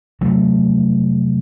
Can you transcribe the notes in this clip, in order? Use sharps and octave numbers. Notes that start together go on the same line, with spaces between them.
F1 F#3 A3